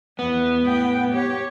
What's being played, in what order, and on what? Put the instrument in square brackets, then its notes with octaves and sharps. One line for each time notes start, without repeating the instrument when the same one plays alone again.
[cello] E2 [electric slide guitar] B3
[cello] A2 G5
G4 C#5